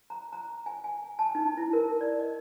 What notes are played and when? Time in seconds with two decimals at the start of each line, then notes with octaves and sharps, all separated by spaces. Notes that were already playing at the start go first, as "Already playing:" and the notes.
0.10 A#5
0.33 A#5
0.66 G#5
0.84 G#5
1.19 A5
1.35 D#4
1.57 E4
1.73 A#4
2.01 D5
2.19 D#5